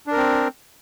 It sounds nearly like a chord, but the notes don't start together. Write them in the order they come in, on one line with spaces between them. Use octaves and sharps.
D4 A#4 C4